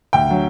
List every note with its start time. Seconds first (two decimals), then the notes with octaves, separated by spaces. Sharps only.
0.13 D2 G5
0.28 D3 F#3